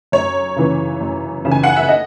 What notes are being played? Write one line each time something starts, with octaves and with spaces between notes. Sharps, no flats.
F#2 C#5
C#3 E3
F#2
C#3 E3
G#5
F#5
E5
D#5